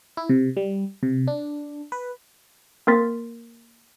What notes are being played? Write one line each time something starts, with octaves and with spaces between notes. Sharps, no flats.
E4
C3
G3
C3
D4
B4
A#3 C4 A#4 C6 A6 B6